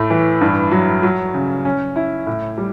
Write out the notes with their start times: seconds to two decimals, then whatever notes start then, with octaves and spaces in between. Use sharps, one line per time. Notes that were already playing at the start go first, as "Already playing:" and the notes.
Already playing: A2 A3
0.10 E3
0.41 G2
0.71 F#3
1.03 F#3
1.34 C#3
1.65 C#4
1.96 E4
2.26 A2
2.58 G3